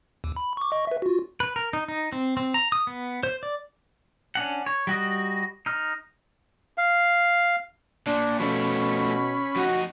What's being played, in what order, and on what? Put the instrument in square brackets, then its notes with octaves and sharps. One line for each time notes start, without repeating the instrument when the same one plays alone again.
[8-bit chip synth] D#2
B5
C#6 D6
D#5 C#6
B4 E5
F4 F#4
[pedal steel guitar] B4
A#4
D#4
D#4
C4
C4
A#5
D#6
B3
C5
D5
C#4 D4 F#5
C#5
G3 F#4 D#5
D#4 F6
[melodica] F5
[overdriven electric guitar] A#2 [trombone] D4
[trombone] B2 [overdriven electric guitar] F3 A3 [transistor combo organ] C#4 B5
[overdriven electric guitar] F2 D#4 [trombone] F#4